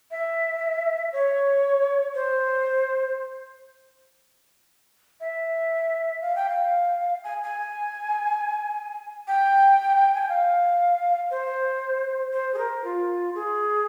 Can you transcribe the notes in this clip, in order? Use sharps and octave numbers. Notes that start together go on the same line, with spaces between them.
E5
C#5
C5
E5
F5
G5
F5
G#5
G#5
G5
G#5
G5
F5
C5
C5
G#4
A#4
F4
G#4